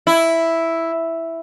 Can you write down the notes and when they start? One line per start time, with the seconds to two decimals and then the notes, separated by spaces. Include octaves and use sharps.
0.07 E4